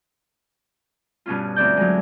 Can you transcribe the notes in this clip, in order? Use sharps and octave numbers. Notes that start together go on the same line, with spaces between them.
G2 B2 C#4 F4
D2 C4 D5 G6
F#3 G#3